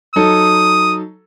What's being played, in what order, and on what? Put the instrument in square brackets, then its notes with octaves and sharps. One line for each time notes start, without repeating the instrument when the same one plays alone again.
[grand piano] F#3 D#4 A4 [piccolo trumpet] D#6